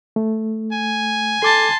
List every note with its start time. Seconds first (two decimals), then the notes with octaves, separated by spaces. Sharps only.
0.16 A3
0.73 G#5
1.43 A4 A5 C6 D6